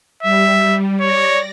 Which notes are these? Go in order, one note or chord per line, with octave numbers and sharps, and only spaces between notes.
G3 E5
C#5 D5 A#6